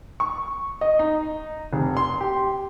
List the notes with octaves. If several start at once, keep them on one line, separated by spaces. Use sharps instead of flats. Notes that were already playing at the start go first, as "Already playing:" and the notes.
C#6
D#5
D#4
F1
C6
G4